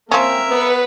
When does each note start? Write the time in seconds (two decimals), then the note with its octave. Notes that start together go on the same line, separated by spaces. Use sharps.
0.11 F3 A#3 C4 C#4 A#4 E5
0.50 B3 B4 F#5